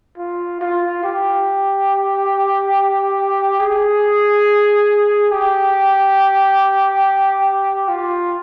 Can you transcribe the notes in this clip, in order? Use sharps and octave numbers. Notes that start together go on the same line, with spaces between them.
F4
F4
G4
G#4
G4
F4